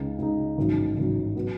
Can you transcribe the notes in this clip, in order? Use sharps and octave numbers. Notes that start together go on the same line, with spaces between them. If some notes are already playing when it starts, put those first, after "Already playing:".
Already playing: C#2 C#3 G#3 D#4
C#2 C#3 G#3 D#4
A1 G#2 D#3 F#3
A1 G#2 D#3 F#3
B2 F#3 B3